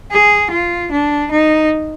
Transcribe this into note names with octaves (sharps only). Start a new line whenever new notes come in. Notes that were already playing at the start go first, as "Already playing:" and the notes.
G#4
F4
D4
D#4